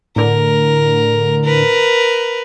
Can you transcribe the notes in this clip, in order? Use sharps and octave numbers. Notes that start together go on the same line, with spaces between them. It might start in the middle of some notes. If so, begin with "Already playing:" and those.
A2 D3 A#4
A#4 B4